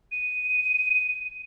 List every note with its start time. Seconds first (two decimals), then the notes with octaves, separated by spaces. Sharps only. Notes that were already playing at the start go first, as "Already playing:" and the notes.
0.11 D#7